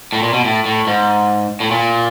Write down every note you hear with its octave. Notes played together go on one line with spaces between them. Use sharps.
A2
A#2
B2
A2
A2
G#2
A2
A#2